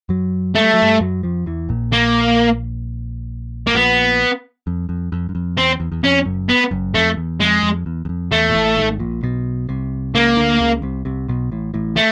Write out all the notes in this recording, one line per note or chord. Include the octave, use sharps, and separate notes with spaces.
F#2 F#3
G#3 A3
G3
F#3
G2 G3
F#2 F#3
F2 F3
E2 E3
A#1 A#2
A#3
A#3
A#1 A#2 B3
F2
F2
F2
F#2
F2
E2 C4
E2
E2
F2 C#4
F#1 F#2
B3
F#1 F#2
F2 A3
E2
F2 G#3
F2
E2
E2
F2
E2 A3
A#2
A1 A2
G#1 G#2
A#1 A#2
B1 B2
C2 C3
C#2 C#3 A#3
D2 D3
C#2 C#3
C2 C3
C2 C3
B1 B2
A1 A2
A1 A2
A3